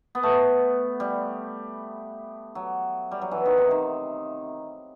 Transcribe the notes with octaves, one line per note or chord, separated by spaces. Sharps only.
B3
A3
G3
F#3
G3
F#3
E3
D#3
C3
D#3